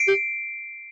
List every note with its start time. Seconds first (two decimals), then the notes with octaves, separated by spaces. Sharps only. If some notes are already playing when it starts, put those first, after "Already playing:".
Already playing: C7 D7
0.08 G4